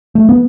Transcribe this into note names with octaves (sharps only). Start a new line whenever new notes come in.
A3
B3